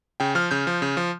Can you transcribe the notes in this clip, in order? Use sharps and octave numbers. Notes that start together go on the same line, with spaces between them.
C#3 G5
F3 F6
C#3 G6
F3
C#3
F3